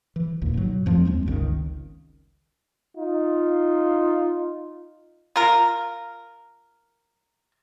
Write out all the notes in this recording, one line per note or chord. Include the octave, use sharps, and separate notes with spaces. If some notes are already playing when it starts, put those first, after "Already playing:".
E3
G#1 D#2 A#2
G#2 B2 F#3
F2 F3 A3 C4
D#2 G#3 C4 C#4
G1 C#2 D3 D#3
D#4 F4
F4 A#4